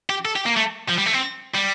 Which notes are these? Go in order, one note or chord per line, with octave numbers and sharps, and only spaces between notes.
G4
A4
G4
A#3
A3
F3
G3
A3
C4
G3